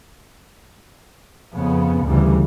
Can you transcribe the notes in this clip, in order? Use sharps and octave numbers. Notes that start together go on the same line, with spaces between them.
F2 C#3 B3
D2 C#3 E3 G3